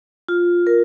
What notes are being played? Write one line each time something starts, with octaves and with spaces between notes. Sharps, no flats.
F4
A#4